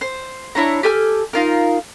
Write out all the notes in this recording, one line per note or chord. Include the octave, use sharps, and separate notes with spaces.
C5
D4 E4 C#5 A#5
G4 A4 G#5 F6
D#4 F4 A#4